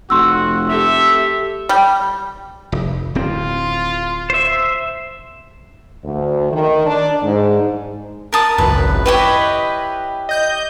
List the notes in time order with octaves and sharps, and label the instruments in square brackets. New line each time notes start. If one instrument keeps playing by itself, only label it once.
[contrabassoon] F1 [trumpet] F#4 [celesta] C6 E6
[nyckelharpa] G4 A4 [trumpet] E5
[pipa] G3
[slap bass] F1
[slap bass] D1 C4 [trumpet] F4
[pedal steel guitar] C5 E5
[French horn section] D2
D#3
D4
G#2
[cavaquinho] A#4 A5 D#6
[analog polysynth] G#1 C#2 F#2 [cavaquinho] B4
[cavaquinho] E4 G4 C#5 [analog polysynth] B4 D#5
[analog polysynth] D#5 G6